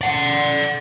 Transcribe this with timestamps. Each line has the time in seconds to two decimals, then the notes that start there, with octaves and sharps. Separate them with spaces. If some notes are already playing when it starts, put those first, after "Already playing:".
0.01 D5 F#5